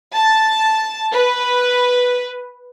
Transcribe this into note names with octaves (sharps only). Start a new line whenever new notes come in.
A5
B4